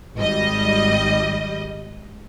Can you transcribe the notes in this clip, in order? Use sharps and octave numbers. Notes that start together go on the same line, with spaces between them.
G#1 G3 D#5